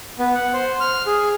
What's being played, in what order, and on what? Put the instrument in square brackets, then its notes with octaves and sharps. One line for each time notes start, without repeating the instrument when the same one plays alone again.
[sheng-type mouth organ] B3
F#5
C5
F6
G#4